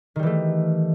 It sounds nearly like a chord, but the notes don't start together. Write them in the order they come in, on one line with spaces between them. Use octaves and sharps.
D#3 G3 E3 A3